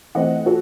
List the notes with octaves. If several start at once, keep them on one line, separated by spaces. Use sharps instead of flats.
E3 A3 C4 D#5 F#5
F#4 A4